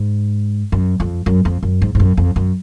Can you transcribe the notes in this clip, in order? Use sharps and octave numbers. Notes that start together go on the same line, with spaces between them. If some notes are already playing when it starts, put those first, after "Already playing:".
Already playing: G#2
F#2
F2
F#2
F2
F#2
G#2
G#2
F#2
F2
F#2